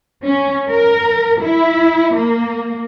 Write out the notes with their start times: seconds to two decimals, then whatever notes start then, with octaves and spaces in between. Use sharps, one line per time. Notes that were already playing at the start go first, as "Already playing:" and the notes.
0.25 C#4
0.70 A#4
1.42 E4
2.15 A#3